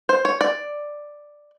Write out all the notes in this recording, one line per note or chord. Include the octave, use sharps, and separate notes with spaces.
C5
C#5
D5